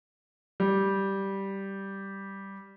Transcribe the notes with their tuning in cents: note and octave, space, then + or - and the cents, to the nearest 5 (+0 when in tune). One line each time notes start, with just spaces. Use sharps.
G3 -5